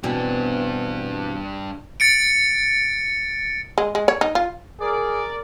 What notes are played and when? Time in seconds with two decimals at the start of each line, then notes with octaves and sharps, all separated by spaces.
0.03 G2 B2 E3 C4 D4
2.00 A6 C#7 D7
3.78 G#3
3.95 G#3
4.08 C#5
4.21 D#4
4.35 F4
4.80 G#4 A#4 D5